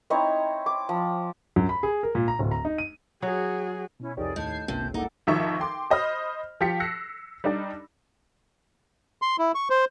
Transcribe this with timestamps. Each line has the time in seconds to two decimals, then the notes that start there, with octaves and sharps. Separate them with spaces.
0.10 C4 D#4 E4 C#5
0.66 D6
0.89 F3
1.56 F#2
1.69 B5
1.83 G#4
2.03 A#4
2.15 A#2
2.28 A#5
2.39 D1
2.51 A#5
2.65 D#4
2.78 D#7
3.22 F#3 F#4 G#4
4.00 B2 C#4 E4
4.17 C2 F2 D#4 G4 G#4 A#4 C#5 D5
4.36 D#2 A2 D#5 A5 G6 G#6 C7
4.68 G1 C#2 C3 A#3
4.94 A#3 D#4 E4 A4 F#5 A#5 D6
5.27 G#1 D#2 F3 D#4 E5 C#6
5.60 G5 C6 D6
5.90 C5 D#5 B5 F6
6.61 F3 G4 F5 B6 C#7
6.80 E6 F#6 A#6 C7 C#7
7.44 G3 D4 D#4 D5
9.22 C6
9.38 E4
9.55 C#6
9.70 C5